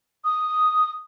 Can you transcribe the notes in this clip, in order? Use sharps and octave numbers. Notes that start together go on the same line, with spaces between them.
D#6